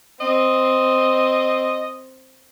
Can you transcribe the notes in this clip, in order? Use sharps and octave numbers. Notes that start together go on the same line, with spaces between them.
C4 D#5